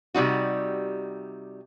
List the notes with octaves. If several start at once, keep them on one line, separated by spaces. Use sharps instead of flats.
C3 G3 D#4 F#4